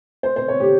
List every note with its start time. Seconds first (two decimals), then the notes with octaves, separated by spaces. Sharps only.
0.23 C5
0.36 C5
0.48 C#5
0.60 G4